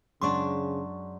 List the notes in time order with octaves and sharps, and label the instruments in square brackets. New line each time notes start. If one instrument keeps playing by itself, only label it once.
[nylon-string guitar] F#2 G#3 D4 [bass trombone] C#3 [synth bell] C6 C#6